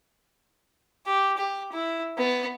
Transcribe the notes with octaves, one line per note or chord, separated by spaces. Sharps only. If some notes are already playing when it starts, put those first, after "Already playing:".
G4
G4
E4
B3